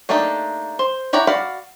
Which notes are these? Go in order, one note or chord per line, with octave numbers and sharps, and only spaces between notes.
A3 A#3 D4 D#4 G4
C5
E4 G4 C#5 F#5 A#5
F#4 D5 F5 B5